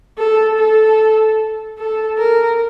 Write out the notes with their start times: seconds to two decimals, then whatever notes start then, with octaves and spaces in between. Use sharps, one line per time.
0.18 A4
0.58 A4
1.78 A4
2.18 A#4